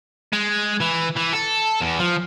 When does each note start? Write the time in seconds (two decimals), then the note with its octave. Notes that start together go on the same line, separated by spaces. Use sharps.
0.33 G#3
0.81 E3
1.17 E3
1.34 A4
1.81 E2
2.00 F3